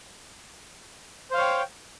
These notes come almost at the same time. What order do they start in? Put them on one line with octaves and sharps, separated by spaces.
C5 F5 C#5 G5